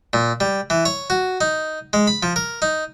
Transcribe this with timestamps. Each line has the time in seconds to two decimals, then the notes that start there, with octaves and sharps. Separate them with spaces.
0.13 A#2
0.40 G3
0.70 E3
0.85 C#5
1.10 F#4
1.41 D#4
1.93 G#3
2.07 B5
2.23 F3
2.36 A#4
2.62 D#4